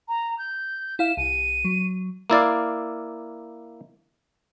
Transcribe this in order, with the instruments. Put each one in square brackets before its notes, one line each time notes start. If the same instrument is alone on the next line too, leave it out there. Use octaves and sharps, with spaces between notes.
[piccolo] A#5
G6
[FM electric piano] E4 F5 [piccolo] E7
[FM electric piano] C2 [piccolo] D#7
[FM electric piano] F#3
[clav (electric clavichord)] A#3 E4 D5 F5